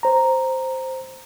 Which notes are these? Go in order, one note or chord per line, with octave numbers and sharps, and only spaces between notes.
C5 A#5